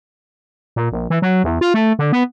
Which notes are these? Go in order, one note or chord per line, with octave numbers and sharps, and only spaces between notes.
A#2
A#1
E3
F#3
E2
F4
A3
D3
B3